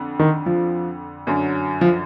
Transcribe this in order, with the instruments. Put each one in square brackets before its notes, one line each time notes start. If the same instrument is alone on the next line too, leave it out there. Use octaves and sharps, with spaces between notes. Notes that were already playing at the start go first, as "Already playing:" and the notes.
Already playing: [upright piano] F2 D3
[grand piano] D#3
F3
[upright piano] F#2 D3 F#3
[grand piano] F3